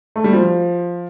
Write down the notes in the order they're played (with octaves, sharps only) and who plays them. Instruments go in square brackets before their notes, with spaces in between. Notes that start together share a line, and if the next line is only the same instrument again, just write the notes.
[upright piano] A3
G3
F3